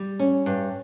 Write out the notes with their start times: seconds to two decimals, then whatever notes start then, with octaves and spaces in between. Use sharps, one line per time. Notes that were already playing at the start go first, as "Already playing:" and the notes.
Already playing: G3
0.19 C#4
0.46 G2